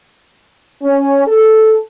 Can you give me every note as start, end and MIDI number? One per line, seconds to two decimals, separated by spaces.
0.83 1.23 61
1.27 1.78 69